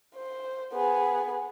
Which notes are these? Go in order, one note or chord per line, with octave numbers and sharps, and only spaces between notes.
C5
B3 G#4